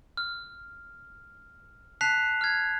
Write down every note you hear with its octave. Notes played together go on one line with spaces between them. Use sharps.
F6
A5 F#6 B6 C7 F7
F6 G#6